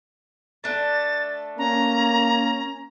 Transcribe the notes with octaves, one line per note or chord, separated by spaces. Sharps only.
A3 D4 G5 A6
A#3 C#4 A#5